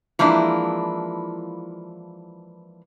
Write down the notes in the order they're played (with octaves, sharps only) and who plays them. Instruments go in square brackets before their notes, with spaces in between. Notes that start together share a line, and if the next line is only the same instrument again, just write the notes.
[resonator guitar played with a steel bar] E3 F3 G#3 A#3 D4 E4